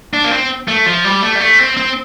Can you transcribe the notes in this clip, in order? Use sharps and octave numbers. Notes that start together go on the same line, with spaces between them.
D4
A#3
C4
A3
F3
G3
A3
G3
A3
C4
C4